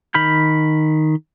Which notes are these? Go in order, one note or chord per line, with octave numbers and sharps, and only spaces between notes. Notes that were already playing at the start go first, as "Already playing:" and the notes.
D#3 B5 F6 G6